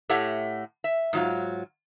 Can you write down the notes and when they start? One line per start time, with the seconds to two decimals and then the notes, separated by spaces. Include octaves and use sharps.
0.09 A2 A3 G4 C#5 F#5
0.84 E5
1.13 G#2 F#3 F4